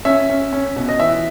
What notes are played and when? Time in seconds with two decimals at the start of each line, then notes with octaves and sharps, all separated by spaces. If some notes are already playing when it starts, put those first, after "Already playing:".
0.05 C#4 E5
0.30 C#4
0.53 C#4
0.76 B2
0.89 D#5
0.99 E3 E5